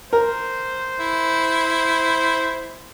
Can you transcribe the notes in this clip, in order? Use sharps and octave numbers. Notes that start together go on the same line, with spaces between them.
A#4 C5
E4